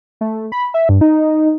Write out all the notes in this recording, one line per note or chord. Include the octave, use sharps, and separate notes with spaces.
A3
B5
E5
G2
D#4